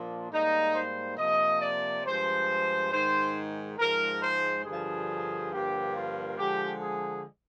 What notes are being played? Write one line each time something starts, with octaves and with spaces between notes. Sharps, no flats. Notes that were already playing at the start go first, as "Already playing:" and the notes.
Already playing: A#2 F3 A#3 D4
G#2 G3 A#3 D#4
C5
C3 F3 A#3 D#5
D5
G2 F3 G#3 C5
G#2 D#3 G#3 C5
G#2 F3 G#3 A#4
C5
G2 D3 F3 G#4
G2 D3 F3 A#3 G4
F4
D3 F3 G#3 G4
G#4